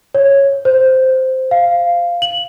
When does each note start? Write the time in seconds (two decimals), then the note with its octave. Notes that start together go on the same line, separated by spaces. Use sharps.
0.15 C#5
0.65 C5
1.51 F5
2.22 F#7